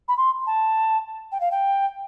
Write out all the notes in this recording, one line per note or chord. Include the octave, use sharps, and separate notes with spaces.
B5
C6
A5
G5
F5
G5